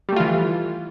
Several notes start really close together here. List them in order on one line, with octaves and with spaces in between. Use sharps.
G3 A3 F4 E3